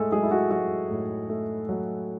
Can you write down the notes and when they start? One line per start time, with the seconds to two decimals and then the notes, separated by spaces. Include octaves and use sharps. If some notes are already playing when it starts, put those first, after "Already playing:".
Already playing: A2 G#3 A3 G#4 A4
0.12 F#3 G#3 G#4
0.23 E4
0.31 F#4
0.51 F#3 F#4
0.91 A2
1.29 A3
1.69 F#3